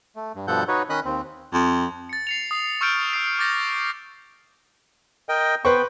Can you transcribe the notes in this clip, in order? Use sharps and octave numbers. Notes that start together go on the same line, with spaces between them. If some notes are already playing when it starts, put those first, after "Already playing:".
A3
G2
G2 B2 F3 A4 F#5 G6
D#4 F#4 B4 C#5
D#3 C#4 D#5 B5 D#6 F#6
D#2 C4
F2
A6 C#7
C7 C#7 F7
D#6 C7
C#6 E6 F6 G6 C#7 D7
D#6 C7
D6 G6 A6 A#6
A#4 D#5 G5
B3 B4 C5 G5 C#6